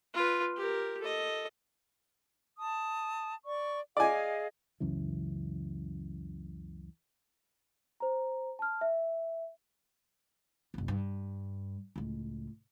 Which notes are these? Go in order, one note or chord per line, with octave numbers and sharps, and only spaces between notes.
F4 B4
G4 A#4
A4 D#5
A5 D#6
D5 C#6
G#4 D5 D#5 F5 G#5
C#2 F#2 C#3 E3
C5 A#5
A5 F6
E5
F#1 C2
G2
C#2 A2